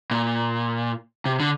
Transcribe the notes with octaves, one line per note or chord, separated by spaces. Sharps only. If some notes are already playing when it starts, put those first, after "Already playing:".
A#2
C3
D3